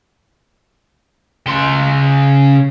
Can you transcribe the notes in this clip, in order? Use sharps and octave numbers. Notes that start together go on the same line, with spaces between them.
C#3 C6